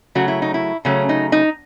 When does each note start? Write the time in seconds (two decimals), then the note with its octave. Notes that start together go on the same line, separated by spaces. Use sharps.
0.15 C#3 F#3 A3 F#4
0.28 E4
0.42 D#4
0.54 E4
0.85 C#3 F#3 A3 C#4
1.09 D#4
1.32 D#4